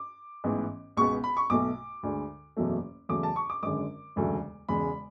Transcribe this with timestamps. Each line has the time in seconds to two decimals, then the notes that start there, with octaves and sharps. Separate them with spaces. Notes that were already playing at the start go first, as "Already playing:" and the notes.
Already playing: D6
0.44 A1 G#2 E3 B3
0.97 C#2 B2 G#3 B3 C#6
1.24 B5
1.37 C#6
1.50 B1 B2 A3 D6
2.03 D2 D3 G#3
2.57 F#1 E2 B2 F#3 A3
3.09 E2 C#3 F#3 A3 D6
3.23 A5
3.36 C#6
3.50 D6
3.62 G#1 F#2 D3 G#3 D6
4.16 E1 D2 C#3 F#3 A3
4.68 E1 E2 C#3 G#3 B5